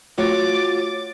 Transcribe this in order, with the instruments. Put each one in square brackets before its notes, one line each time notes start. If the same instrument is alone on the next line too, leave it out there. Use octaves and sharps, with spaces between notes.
[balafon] A3 [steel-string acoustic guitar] F4 F#4 C#5 [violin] D6 A6